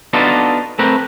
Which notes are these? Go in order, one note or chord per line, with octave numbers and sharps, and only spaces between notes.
B3 D4 D#4 F4 F#4 A4
A3 C4 A#4 B4